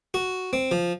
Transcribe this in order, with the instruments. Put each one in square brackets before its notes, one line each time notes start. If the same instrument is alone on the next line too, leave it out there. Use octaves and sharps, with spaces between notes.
[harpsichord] F#4
C4
F3